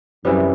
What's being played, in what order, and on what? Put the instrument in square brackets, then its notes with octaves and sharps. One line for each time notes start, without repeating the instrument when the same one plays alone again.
[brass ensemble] F#2 [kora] C3 E3 G3 B3